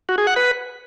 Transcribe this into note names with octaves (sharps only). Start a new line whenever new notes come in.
F#4
G#4
F#5
B4